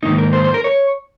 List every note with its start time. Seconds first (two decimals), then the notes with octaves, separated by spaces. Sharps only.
0.03 G#2 D#3 A#3 D#4
0.18 A#4
0.33 C5
0.44 C5
0.54 A#4
0.64 C#5